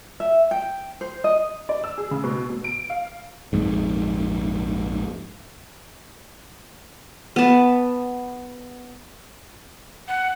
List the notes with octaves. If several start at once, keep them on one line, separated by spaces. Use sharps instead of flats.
E5
G5
C5
D#5
D5
E6
G#4
C#3
B2
B2
D7
F5
A#1 F2 G#2
B3 A5
F#5